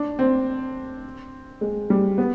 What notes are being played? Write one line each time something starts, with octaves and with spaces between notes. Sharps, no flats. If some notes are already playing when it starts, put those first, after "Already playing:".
Already playing: D4
C4
G#3
G3
B3